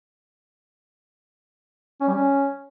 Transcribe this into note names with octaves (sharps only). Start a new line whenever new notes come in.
C#4
G3
C#4